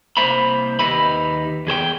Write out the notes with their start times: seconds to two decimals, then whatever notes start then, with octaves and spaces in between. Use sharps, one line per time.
0.17 C2 A#3 C5 E5 A#5 B5
0.79 D#2 D#4 G4 B4 E5 B5
1.67 E2 G#4 C5 G5